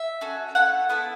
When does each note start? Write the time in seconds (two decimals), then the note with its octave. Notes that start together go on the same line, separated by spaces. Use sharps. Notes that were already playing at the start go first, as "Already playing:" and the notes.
Already playing: E5
0.21 C#4 F#4 A4
0.55 A3 E4 A4 F#5
0.90 B3 E4 A4